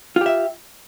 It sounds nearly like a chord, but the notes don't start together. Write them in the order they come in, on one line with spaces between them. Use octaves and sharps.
F4 G4 E5